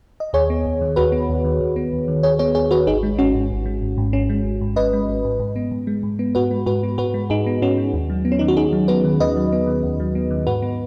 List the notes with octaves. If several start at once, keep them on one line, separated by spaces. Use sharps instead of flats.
D#5
D#2 G#4 C#5
B3
D#2
D#3
D#2 F#4 B4
B3
D#2
D#3
D#2
B3
D#2
D#3
D#2 G#4 C#5
B3 G#4 C#5
D#2 G#4 C#5
D#3 F#4 B4
G#1 D#4 G#4
G#3
G#1 C#4 F#4
G#2
G#1
G#3
G#1
G#2
G#1 C#4
G#3
G#1
G#2
G#1 B4 D#5
G#3
G#1
G#2
G#2
B3
G#2
G#3
G#2
B3
G#2 F#4 B4
G#3
G#2 F#4 B4
B3
G#2 F#4 B4
G#3
G#2 D#4 G#4
B3
G#2 C#4 F#4
G#3
D#2
F#3
B3
C#4
D#3 D#4
F#4
D#2 D#4 G#4
F#3
B3 F#4 B4
D#3
D#2 B4 D#5
F#3
B3
D#3
D#2
F#3
B3
D#3
G#2 F#4 B4
B3